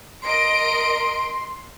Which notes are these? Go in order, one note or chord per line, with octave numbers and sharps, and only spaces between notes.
A#4 D#5 C6 D7